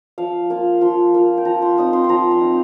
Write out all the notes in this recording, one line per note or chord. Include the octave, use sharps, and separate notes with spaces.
F3 F5
A#3 F4
F3 C6
A#3 F4
G5
F3 A#5
C6
C4 D#4 D#6
C6
C6
F3 A#5
C6
C4 D#4